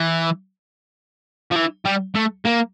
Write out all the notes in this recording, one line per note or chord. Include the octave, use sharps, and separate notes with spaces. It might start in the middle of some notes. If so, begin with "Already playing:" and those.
Already playing: E3
F3
E3
G3
A3
A#3